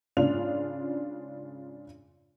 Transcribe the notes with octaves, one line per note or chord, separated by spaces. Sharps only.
G#2 C#3 D4 F4 F7